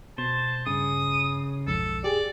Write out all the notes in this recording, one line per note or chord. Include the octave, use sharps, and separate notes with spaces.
B2 C5 A5
G2 C#3 D#6
B1 F2 G#2 A4
G4 G#4 D5